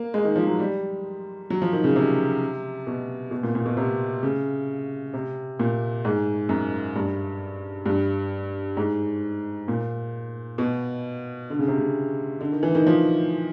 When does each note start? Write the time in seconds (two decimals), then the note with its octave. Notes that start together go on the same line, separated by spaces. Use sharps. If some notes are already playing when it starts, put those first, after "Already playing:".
Already playing: A#3
0.14 G#3
0.25 D#3
0.36 F3
0.47 F#3
0.59 G3
1.50 F#3
1.62 F3
1.73 D#3
1.84 C#3
1.96 C3
2.87 B2
3.31 B2
3.43 A#2
3.55 A#2
3.66 B2
3.77 C3
4.23 C#3
5.14 C3
5.59 A#2
6.05 G#2
6.49 F#2
6.95 G2
7.86 G2
8.77 G#2
9.68 A#2
10.58 B2
11.50 D3
11.59 C#3
11.68 C3
11.78 C#3
12.41 D3
12.52 D#3
12.63 E3
12.75 D#3
12.87 F3